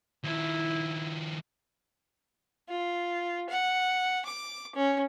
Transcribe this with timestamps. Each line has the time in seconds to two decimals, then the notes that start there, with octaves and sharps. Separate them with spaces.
0.24 D#3 F3 E4
2.69 F4
3.49 F#5
4.25 D6
4.75 C#4